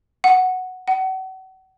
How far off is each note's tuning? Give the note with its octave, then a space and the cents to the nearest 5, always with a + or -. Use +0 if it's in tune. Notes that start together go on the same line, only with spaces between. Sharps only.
F#5 +0
F#5 +35